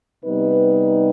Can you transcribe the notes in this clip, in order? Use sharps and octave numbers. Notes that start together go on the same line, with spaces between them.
C3 G3 B3 D#4 B4